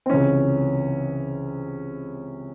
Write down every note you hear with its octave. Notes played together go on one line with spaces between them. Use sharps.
C4
C#2 C3 E3 C#4